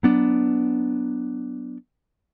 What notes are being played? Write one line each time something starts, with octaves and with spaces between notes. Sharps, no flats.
F#3 B3 D4